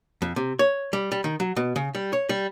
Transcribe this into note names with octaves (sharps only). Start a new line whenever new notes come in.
F2
C3
C#5
G3
G3
D#3
F#3
B2
C#3
G3
C#5
G3